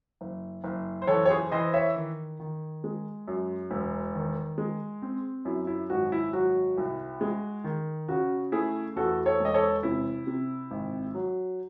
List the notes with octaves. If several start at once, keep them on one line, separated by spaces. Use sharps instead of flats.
F#1
F#1
C5
E3 A4 C#5
C#5
G#4 C5
E3 C5 D#5
C#5 E5
D#3
D#3
G#3
F#2
E1
D#3
G#3
C4
F#2 E4
E4
G#1 F#4
E4
F#3 F#4
C2
G#3
D#3
C#3 F#4
A3 E4 G#4
E2 F#4 A4
A4 C#5
E1 D#5
A4 C#5
C3 E4
C3
G#1
F#3